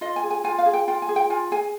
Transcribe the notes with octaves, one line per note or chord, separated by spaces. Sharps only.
F4 D#5
G#5
G#4
G#5
F4 G#5
F5
G#4
G5
F4 G5
G#5
G#4
G5
F4 G#5
G#4 G#5